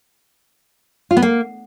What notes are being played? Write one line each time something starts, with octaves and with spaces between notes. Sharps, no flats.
F4
B3
A#3